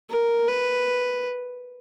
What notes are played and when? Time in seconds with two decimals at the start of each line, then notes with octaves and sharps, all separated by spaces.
0.10 A#4
0.48 B4